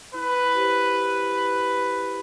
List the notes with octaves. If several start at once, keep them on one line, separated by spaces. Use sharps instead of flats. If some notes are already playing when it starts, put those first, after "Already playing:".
E4 B4
G4 C5
E4
C5